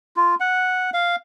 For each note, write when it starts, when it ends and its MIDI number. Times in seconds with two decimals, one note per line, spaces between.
0.16 0.35 65
0.40 0.90 78
0.94 1.16 77